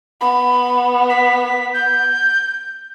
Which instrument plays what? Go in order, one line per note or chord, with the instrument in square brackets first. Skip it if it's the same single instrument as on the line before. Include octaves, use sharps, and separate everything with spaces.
[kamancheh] B3 [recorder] B5
[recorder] B6
G6